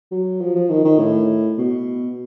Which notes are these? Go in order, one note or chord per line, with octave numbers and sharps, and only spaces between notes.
F#3
F3
F3
D#3
D#3
A2
B2